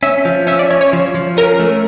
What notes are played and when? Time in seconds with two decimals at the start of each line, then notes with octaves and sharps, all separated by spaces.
0.03 C#4 E5
0.25 F3
0.47 C#4 E5
0.59 D5
0.70 C#4 C#5
0.81 C#5
0.93 F3
1.15 F3
1.37 C#4 A#4
1.60 A3